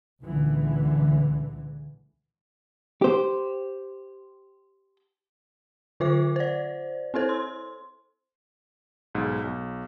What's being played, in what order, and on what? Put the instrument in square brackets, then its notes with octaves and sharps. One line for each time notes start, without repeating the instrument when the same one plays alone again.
[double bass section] C#2 A#2 D3 E3
[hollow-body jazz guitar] G4 C5
[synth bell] D3 F4 C5 E5 D6
C5 D5
C4 E4 A4 C5
C6
[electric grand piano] B1 G#2
B1